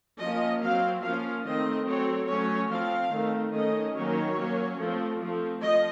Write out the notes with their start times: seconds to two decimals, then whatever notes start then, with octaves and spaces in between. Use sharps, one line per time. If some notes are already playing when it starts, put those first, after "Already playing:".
0.19 F3 A#3 C#4 D#5
0.61 F#3 C4 F5
1.02 F3 A#3 C#4 F5
1.45 D#3 A3 C4 D#5
1.86 F#3 A3 C4 C#5
2.28 F#3 A3 C#4 C#5
2.70 F3 C4 F5
3.11 D#3 A3 C4
3.53 D#3 A3 C#4 D#5
3.94 D#3 F#3 A#3 C#4 C#5
4.36 F#3 A#3 C#4
4.78 F3 A3 C4
5.19 F3 A3 C4
5.61 F3 D#5